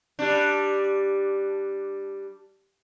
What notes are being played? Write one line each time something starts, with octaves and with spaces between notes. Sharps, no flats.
G3 D4